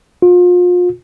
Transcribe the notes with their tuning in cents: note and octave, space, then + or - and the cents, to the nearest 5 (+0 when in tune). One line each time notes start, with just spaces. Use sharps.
F4 +35